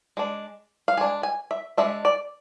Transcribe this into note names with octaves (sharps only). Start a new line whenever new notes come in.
G#3 D4
F5
G#3 D4 G#5
G#5
E5
G#3 D4 E5
D5